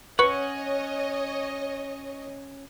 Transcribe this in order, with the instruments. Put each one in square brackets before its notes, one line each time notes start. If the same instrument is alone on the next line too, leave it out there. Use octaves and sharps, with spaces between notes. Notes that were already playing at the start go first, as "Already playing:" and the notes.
[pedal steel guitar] C#4 F#5 [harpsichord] B4 [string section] C#5 D#5 [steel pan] C#6